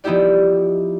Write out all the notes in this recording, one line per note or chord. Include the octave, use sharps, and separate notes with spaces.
F3 B3 D#4 E4 G4 D5